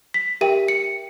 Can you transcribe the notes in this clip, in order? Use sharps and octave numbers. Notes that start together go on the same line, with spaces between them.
B6
G4 A#4 E5 G5 D#7
C#7